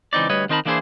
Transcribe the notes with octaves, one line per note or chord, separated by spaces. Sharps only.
C#2 E3 C4 D#4 D5
D2 G3 B4 C#5 D#5
D#3 C4 D#4 A#4 A5 B5
E3 A#3 D4 E4 G#4 C5